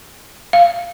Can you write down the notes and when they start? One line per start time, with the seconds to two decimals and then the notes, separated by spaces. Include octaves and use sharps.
0.53 F5